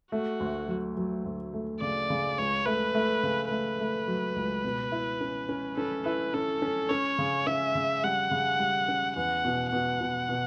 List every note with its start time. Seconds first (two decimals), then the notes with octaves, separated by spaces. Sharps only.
0.12 A3 F#4
0.40 D2
0.68 F#3
0.97 F#3
1.25 D2
1.53 A3
1.81 C#3 D5
2.10 C#3
2.38 C#2 C#5
2.66 A3 B4
2.95 A3
3.23 C#3
3.51 A3 B4
3.80 A3
4.08 F#3
4.36 C#2
4.64 B2
4.92 E4
5.21 C#4
5.49 C#4
5.77 C#4 A4
6.05 E4 B4
6.34 C#4 A4
6.62 C#4
6.90 C#4 C#5
7.18 C#3
7.46 C#4 E5
7.75 C#3
8.04 G3 F#5
8.31 C#3
8.60 G3
8.88 C#4
9.16 E2 F#5
9.45 B2
9.73 B2 F#5
10.01 B2
10.29 B2